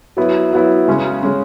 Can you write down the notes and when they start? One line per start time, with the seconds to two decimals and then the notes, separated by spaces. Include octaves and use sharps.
0.17 F#3 B3 E4
0.53 F#3 B3 E4
0.88 C#3 G#3 C#4
1.23 C#3 G#3 C#4